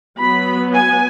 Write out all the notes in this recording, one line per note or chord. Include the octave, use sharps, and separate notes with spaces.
F#3 B3 B5
G#5